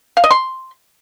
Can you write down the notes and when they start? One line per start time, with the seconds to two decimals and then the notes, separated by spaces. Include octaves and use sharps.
0.17 F5
0.24 D#5
0.31 C6